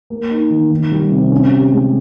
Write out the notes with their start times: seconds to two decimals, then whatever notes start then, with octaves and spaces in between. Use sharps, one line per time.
0.10 A#3
0.31 D#4
0.50 D#3
0.71 D#3
0.91 G3
1.11 C3
1.32 C#4
1.51 G4
1.72 G#3